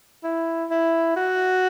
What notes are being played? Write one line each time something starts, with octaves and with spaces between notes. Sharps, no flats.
E4
E4
F#4